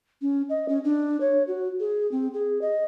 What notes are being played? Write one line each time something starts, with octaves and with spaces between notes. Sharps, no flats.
C#4
D#5
C#4
D4
C#5
F#4
G#4
C4
G#4
D#5